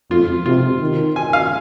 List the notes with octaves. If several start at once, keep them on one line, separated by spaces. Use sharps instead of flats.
F2 F4
C3 F4
D#3
G#5
F5